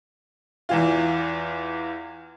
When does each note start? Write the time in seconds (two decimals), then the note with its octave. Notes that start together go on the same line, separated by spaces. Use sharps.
0.69 E2 E3 F4